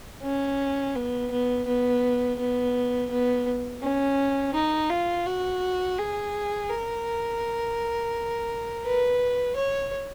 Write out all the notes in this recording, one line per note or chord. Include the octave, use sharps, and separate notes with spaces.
C#4
B3
B3
B3
B3
B3
C#4
D#4
F4
F#4
G#4
A#4
B4
C#5